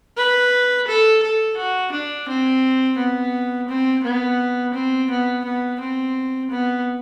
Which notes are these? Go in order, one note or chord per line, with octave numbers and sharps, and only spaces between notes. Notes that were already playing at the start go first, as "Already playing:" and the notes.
B4
A4
A4
F#4
D4
C4
B3
C4
B3
C4
B3
B3
C4
B3